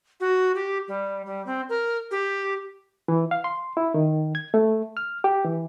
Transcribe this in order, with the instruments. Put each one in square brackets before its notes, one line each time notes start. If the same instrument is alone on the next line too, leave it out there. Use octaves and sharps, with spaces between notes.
[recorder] F#4
G4
G3
G3
C4
A#4
G4
[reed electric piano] E3
F5
C6
E4
D#3
G#6
A3
F6
G4
E3